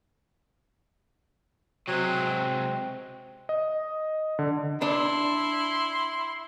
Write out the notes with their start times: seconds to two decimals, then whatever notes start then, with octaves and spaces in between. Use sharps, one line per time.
1.88 C3 F#3 G#3 C4
3.49 D#5
4.39 D3
4.82 D4 E4 C6